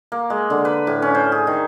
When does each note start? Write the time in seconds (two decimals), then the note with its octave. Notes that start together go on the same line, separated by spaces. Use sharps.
0.12 A#3
0.30 G#3
0.50 D3
0.65 B4
0.87 A2
1.02 C#4
1.15 C5
1.32 G#4
1.47 D#3